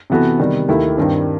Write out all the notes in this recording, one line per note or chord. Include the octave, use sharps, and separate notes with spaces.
C3 E3 B3 F#4 A4
C3 D#3 G3 B3
D#2 D#3 A3 E4 G4
G2 D#3 G3 C4